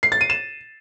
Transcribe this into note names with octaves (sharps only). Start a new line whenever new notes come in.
C7
A6
D#7
E7